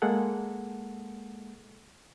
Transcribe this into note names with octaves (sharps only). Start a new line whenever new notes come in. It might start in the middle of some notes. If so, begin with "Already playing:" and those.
G#3 A#3 G#4 A4 F#5